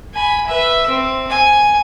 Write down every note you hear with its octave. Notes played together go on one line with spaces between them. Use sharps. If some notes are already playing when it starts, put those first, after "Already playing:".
G#5 B5
B4 E5
C4
G#5